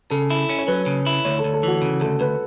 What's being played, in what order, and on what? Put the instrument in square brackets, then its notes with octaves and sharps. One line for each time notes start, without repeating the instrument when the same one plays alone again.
[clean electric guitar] C#3 [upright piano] A4
[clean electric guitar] E4
C#4
[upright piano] C#5
[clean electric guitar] F#3 [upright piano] B4
[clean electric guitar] C#3
E4
[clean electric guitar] D2 [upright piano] C#5
[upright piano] A4
[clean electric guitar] D2
[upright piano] A4
[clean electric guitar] E3 [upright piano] F#4
[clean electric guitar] C#3
[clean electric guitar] D2 [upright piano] A4
[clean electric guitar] D2 [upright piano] B4